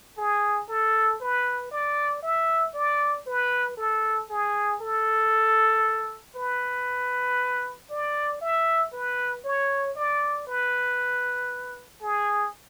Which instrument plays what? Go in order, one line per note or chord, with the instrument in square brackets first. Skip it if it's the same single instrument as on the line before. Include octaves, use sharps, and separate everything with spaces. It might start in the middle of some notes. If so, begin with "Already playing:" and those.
[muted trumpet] G#4
A4
B4
D5
E5
D5
B4
A4
G#4
A4
B4
D5
E5
B4
C#5
D5
B4
G#4